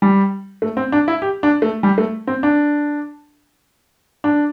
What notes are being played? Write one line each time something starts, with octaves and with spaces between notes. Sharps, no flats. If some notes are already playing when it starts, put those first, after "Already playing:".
G3
A3
C4
D4
E4
G4
D4
A3
G3
A3
C4
D4
D4